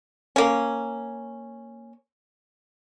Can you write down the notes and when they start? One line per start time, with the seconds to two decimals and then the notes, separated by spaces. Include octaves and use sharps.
0.36 A#3 C#4